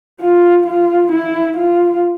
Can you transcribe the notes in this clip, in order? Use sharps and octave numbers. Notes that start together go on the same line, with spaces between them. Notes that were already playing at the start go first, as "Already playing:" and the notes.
F4
F4
E4
F4